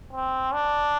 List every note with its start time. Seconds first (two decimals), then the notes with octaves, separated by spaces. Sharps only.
0.13 C4
0.53 D4